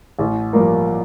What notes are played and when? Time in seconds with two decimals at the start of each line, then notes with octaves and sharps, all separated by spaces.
0.19 A1
0.53 G2 F3 A#3